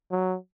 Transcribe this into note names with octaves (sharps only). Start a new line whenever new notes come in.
F#3